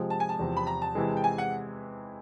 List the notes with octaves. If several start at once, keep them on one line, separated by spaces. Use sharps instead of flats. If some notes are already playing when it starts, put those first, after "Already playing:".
Already playing: C3 F3 G#3
A5
G#5
A5
E2 C3 F3
B5
A#5
A5
C3 E3 G#3
G5
G#5
F#5